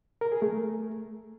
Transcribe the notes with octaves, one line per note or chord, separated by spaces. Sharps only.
A#4
G#4
A3